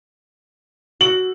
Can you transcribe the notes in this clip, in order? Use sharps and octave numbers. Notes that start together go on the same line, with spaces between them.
F#4 F#7